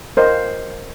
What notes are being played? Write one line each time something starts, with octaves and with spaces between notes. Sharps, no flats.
A#4 C5 D#5